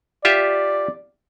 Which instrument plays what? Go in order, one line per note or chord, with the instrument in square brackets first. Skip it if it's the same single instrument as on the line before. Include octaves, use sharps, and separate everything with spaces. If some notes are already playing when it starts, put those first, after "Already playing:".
[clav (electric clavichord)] F4 G4 E5 [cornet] D5